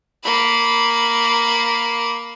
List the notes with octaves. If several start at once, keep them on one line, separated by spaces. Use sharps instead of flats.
A#3 B5